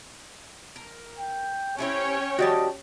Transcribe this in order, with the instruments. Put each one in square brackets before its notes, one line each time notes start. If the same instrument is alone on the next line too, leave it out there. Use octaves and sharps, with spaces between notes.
[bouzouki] A#4
[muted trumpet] G5
[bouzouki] C4 E4 G4 [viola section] C#4 C#5 G5 [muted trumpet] G#5
[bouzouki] D#3 B4 A5 [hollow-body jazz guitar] F#4 G4 D5 [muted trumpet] D#5